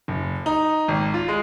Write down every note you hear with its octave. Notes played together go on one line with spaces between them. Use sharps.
F#1
D#4
G#1
F4
G#3